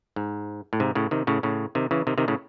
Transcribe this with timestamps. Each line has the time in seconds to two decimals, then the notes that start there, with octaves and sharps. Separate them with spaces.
0.16 G#2
0.73 A2
0.80 G#2 C3
0.95 A2 C#3
1.11 C3 D#3
1.27 A2 C#3
1.43 A2 C#3
1.75 C3 D#3
1.91 C#3 E3
2.07 C3 D#3
2.18 C3 D#3
2.28 A2 C#3